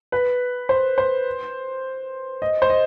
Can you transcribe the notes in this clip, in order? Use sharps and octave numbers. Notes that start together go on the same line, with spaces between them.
B4
C5
C5
D#5
C5
D#5